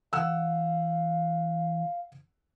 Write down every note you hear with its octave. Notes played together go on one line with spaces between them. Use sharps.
E3 F5 F#5 E6